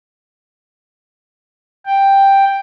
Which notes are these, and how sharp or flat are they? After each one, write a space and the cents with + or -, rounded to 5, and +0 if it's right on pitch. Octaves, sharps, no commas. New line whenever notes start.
G5 +5